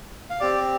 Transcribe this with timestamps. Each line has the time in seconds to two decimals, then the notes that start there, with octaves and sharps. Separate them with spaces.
0.30 F5
0.40 C4 G4 D5